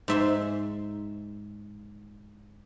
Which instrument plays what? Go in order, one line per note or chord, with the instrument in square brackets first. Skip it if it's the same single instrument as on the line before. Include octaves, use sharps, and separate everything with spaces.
[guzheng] G#2 E5 C6